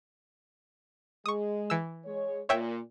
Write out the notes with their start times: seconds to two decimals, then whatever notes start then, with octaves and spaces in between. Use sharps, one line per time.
1.26 G#3 C#6 D#6
1.70 E3 E6
2.05 G#3 C#5
2.49 A#2 C#5 E5 G5